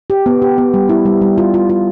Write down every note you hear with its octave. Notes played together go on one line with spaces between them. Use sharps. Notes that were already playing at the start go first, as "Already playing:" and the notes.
G4
B3
G4
B3
G3
E4
G3
G3
F4
F4
F4